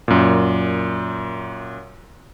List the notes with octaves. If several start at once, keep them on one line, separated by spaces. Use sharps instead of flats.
F#2 A#2